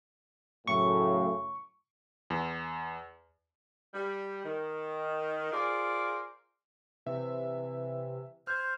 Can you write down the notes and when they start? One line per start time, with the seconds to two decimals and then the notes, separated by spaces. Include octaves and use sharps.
0.68 F#2 A2 C#3 C#6
2.30 E2
3.93 G3
4.44 D#3
5.51 F4 G#4 A#4 C5 D5
7.07 C3 E3 E5
8.47 C5 F6 G#6